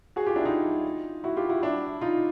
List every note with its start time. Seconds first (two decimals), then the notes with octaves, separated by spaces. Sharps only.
0.16 F#4 G#4
0.27 F4 G4
0.36 D4 E4
0.45 D#4 F4
1.24 E4 F#4
1.37 F4 G4
1.49 E4 F#4
1.62 D4 E4
2.01 D#4 F4